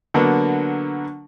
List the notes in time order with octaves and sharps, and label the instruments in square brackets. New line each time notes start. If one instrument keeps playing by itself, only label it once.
[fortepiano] D3 F#3 A#3 B3 D4